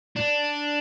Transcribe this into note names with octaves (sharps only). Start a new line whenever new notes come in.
D4